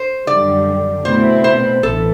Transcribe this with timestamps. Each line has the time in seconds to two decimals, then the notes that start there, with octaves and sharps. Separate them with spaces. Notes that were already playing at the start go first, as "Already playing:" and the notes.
Already playing: C5
0.27 F#2 D3 G3 D5
1.05 B2 A3 C4 E4 C5
1.44 C5
1.83 A1 E3 A4